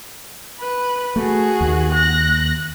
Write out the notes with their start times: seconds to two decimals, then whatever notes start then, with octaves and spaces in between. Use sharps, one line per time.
0.60 B4
1.16 A3 F#4 G#4
1.61 D#2
1.92 F#6 A#6